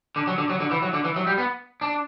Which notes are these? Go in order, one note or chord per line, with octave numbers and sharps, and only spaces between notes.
D3
F#3
D3
F#3
D3
E3
F#3
D3
E3
F#3
G3
B3
D4